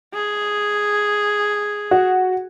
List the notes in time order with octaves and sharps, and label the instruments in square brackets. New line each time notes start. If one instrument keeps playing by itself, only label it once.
[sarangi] G#4
[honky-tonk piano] F#4